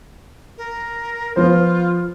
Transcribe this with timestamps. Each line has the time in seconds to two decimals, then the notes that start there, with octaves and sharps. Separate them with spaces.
0.58 A#4
1.36 F3 B3 F4 C5